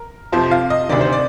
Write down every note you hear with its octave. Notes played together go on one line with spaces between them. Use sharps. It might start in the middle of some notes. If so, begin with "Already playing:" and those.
Already playing: A#4
F2 C3 F3 C5
F5
D#5
D2 C3 D#3 D5
C5
D5